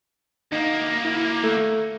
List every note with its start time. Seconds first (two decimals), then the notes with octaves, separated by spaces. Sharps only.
0.52 D2 A#3 D#4
1.04 E4
1.44 A3